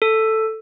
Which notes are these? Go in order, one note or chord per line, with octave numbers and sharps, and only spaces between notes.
A4